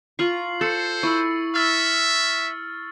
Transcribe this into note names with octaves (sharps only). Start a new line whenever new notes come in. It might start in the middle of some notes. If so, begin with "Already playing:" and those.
F4 A#5 C#6 C7 F#7
A4 C5 A6 C#7
E4 C#6 E6
E5 E6 F6 A6